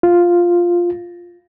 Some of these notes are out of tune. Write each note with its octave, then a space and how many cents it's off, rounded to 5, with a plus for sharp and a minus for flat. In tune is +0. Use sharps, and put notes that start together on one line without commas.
F4 +0